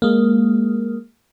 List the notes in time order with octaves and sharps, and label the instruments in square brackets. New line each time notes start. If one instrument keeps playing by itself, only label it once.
[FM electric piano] G#3 A#3